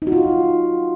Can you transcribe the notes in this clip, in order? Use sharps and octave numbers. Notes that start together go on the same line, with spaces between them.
D#4
F#4
F4